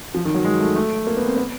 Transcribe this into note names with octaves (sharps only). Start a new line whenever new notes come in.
F3
D#3
F#3
G#3
A3
A3
A#3
B3
C4
B3